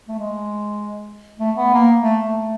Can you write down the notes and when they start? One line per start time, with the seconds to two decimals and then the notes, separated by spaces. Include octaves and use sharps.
0.08 A3
0.19 G#3
1.39 A3
1.57 B3
1.74 A#3
2.00 A3
2.26 A3